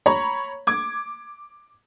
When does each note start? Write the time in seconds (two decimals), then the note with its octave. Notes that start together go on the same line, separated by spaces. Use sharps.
0.06 C#5 A#5 B5 C#6
0.67 D6 G#6